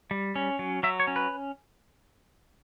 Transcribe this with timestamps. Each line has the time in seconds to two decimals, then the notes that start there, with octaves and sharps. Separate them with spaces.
0.11 G3
0.36 C#4
0.59 F#3
0.83 F#3 E5
1.00 C#5
1.07 C#4
1.16 B4